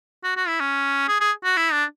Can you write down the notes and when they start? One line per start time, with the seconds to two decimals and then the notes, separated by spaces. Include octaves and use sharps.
0.24 F#4
0.36 F#4
0.48 E4
0.60 C#4
1.08 G#4
1.20 G#4
1.44 F#4
1.57 E4
1.72 D4